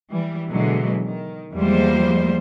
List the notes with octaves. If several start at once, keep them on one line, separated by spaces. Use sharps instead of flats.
E3 G3
B2 D3 E3 F#3 G#3
D#3
E2 F3 G3 G#3 A#3 C5